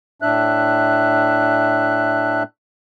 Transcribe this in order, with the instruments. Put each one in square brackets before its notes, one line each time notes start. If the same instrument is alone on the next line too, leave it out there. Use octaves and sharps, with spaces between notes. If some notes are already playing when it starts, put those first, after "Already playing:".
[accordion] A2 D4 E5 F#6